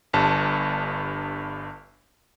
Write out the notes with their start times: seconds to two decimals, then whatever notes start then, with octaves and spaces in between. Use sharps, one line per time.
0.13 G1 G2 A5